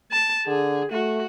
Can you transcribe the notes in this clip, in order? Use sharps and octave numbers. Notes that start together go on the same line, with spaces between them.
A5
D3 G#4
A3 F#4